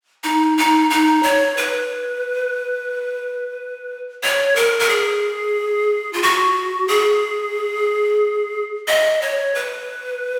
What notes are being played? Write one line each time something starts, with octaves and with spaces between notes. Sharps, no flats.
D#4
D#4
D#4
C#5
B4
C#5
A#4
A#4
G#4
F4
F#4
G#4
D#5
C#5
B4